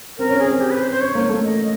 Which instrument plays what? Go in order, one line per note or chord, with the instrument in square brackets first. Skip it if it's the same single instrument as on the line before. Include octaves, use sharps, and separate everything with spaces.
[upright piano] C4 [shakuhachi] A#4
[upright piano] C#4
[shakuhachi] G#4
[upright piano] C#4
C4
[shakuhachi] G4
B4
C5
C5
[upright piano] C#4 [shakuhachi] C#5
[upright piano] A#3
A3
[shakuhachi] D#5